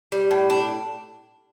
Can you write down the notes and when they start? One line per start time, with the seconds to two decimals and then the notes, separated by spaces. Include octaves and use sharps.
0.12 G3
0.31 A2
0.50 D4